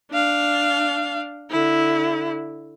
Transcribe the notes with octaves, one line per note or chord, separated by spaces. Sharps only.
D4 F5
D3 E4